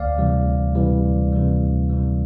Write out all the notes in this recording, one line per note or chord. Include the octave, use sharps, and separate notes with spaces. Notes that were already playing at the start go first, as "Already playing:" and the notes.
Already playing: D2 D5 F5
C3 E3 G3
D2
C3 E3 G3
D2
C3 E3 G3
D2
C3 E3 G3